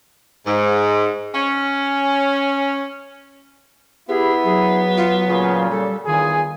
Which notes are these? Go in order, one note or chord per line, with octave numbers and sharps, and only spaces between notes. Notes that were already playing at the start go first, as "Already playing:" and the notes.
G#2
C#4
B3 E4 G4 G#4
F#3 G#4
F4
A#2 C#3 F4
G3 A4
E2 D#3 F4 G#4 G#5